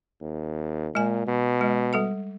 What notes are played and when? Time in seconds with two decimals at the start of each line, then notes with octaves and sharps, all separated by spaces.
0.21 D#2
0.95 A#2 G#3 G#5
1.27 B2
1.61 G#3
1.93 G3 A4 F#5